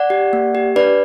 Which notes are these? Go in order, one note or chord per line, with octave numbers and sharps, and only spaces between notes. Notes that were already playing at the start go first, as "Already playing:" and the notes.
Already playing: D5 F#5
G4
A#3
G4
D4 B4 D5